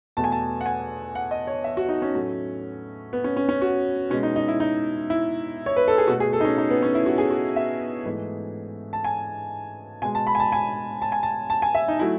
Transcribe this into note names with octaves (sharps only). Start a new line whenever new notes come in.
E2 B2 A3 A5
G#5
A5
F#5
G#5
F#5
D#5
C#5
E5
F#4
D#4
C#4
A2 F#3 A3
B3
C#4
C#4
C#4
F#4
B2 G#3 C#4
D#4
D#4
E4
D#4
E4
C#5
B4
A4
G#4
B2 A3 F#4
G#4
A4
D#4
C#4
D#4
B3
C#4
E4
F#4
G#4
F#4
E5
G#2 E3 A3
A5
G#5
B2 G#3 G#5
A5
B5
G#5
A5
G#5
A5
G#5
A5
A5
G#5
E5
D#4
F#3 A3 E4